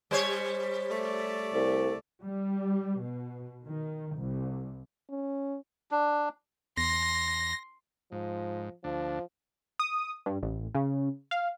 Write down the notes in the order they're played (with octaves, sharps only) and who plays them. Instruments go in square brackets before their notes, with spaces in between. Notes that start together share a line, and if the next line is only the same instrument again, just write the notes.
[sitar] G3 C5 C#5
[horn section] A3 D5
[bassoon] C2
[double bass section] G3
B2
D#3
C2
[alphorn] C#4
[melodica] D4
[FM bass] E2 [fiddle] C6 [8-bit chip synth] A#6
[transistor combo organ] G#2 [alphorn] F3
[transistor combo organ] D2 D4 [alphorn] F3
[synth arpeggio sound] D#6
G2
A1
C#3
F5